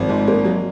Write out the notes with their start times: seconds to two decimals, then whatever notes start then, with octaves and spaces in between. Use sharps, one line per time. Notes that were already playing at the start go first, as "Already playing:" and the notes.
Already playing: G#1 F3
0.09 G#2
0.28 A#3
0.45 F#3